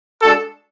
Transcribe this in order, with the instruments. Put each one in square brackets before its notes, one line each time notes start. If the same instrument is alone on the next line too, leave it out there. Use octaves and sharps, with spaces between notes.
[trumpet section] G#3 D4 F#4 A4